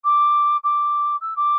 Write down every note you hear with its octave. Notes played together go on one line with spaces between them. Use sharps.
D6
D6
E6
D6